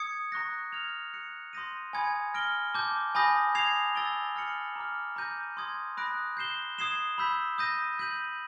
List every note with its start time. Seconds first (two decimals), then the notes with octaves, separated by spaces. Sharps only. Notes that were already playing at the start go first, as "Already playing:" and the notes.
Already playing: D#6 G#6 C#7
0.32 A#5 C#6 F#6 A#6
0.72 F6 G#6 C#7 F7
1.13 F#6 A#6 C#7
1.53 C6 D#6 G6 A#6 D#7
1.93 G#5 B5 D#6 G#6 C#7
2.34 F6 A#6 D7 G7
2.74 A5 D6 G6
3.15 G#5 B5 D#6 G6 A#6
3.55 D#6 G#6 C7 F7
3.95 E6 A6 D7 G7
4.36 F6 A6 C#7 F#7
4.76 A#5 D6 F6
5.16 A#5 D6 G6 A#6 D#7
5.57 C6 D#6 G#6
5.97 B5 D#6 F#6 A#6 D7
6.37 G6 C7 E7 G7
6.78 D#6 G#6 C7 E7 G7
7.18 B5 E6 G6 B6
7.58 D#6 G6 A#6 D#7
7.99 G6 B6 D#7 F#7